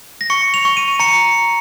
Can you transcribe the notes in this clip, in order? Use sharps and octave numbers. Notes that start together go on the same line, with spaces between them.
A#6
C#6 C#7
F7
C#6
D#7
A#5 C#7